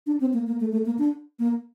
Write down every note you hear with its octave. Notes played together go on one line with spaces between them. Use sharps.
D4
C4
A#3
A#3
A3
A3
A#3
D4
A#3